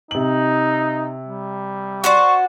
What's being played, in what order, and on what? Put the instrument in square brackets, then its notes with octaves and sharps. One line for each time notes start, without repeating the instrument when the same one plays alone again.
[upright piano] C3 F#7 [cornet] D#4
[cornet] G3
[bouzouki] F#4 C5 D5 [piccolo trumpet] C#6